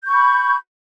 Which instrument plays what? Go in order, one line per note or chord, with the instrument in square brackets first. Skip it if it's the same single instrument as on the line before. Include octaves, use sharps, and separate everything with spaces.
[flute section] G6
C#6
B5